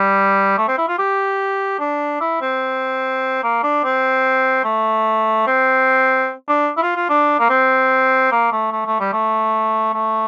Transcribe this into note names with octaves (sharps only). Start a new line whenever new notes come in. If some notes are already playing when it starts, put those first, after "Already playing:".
Already playing: G3
A3
C4
E4
F4
G4
D4
E4
C4
A#3
D4
C4
A3
C4
D4
E4
F4
F4
D4
A#3
C4
A#3
A3
A3
A3
G3
A3
A3